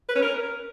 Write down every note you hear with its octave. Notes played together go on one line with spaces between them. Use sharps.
B4
C#4
A#4